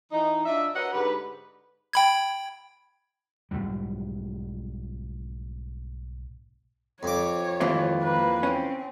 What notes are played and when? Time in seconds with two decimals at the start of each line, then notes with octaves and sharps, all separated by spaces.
0.12 E3 D#4
0.46 D4 F4 D#5 E5
0.74 F#4 A#4 B4 C#5 D#5 F#5
0.92 G#2 D3 G4 B4
1.93 G5 B5 G#6
3.51 B1 F2 G#2 G3
7.03 F2 C#5 D6
7.60 D#2 G#2 E3 F3 C4 F4
8.02 A#3 B4
8.43 C4 C#4